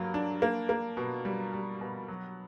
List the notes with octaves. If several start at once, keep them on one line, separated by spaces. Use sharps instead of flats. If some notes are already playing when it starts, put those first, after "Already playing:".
Already playing: G2 F#3 A#3
D4
A#3
A#3
B2
G3
G3
B2
F#3